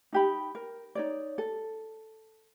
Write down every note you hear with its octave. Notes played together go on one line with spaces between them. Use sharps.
D#4 G4 B5
A#4
D#4 C#5 D5
A4